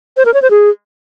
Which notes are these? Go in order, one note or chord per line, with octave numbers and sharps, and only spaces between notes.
C5
A#4
C#5
C5
G#4